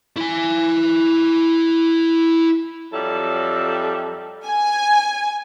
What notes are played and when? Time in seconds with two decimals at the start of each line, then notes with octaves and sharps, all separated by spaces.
0.16 E4 G#5
2.93 F2 F#3 G3 A4 E5
4.48 G#5